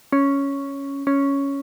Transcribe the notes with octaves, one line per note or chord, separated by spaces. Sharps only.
C#4
C#4